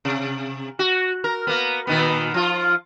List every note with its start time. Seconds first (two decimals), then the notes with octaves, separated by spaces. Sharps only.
0.05 C3
0.79 F#4
1.24 A#4
1.47 A#3 B3
1.87 A#2 D#3 B3
2.34 F3 F4